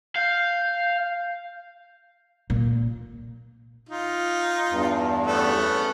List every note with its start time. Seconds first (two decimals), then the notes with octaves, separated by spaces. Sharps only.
0.16 F5 G6
2.50 A#2
3.89 D#4 F4
4.70 E2 G2
5.26 A3 B3 C#4